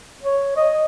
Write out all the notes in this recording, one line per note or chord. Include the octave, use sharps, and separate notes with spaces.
C#5
D#5